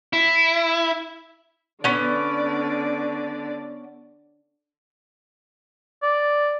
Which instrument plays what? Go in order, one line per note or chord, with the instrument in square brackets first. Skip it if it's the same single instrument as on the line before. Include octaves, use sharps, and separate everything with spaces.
[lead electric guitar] E4
[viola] D3 D5 [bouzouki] B3 C#4
[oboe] D5